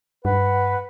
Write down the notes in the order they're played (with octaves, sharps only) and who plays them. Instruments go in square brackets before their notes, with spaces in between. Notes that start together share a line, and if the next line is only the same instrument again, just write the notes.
[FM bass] G2 [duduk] B4 [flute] F#5